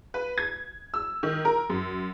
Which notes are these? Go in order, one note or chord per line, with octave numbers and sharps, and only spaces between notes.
B4
G#6
E6
D#3
A#4
F#2